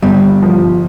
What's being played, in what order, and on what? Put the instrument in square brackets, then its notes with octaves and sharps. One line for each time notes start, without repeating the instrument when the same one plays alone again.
[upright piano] G1 [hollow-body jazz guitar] G2 G3
[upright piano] F3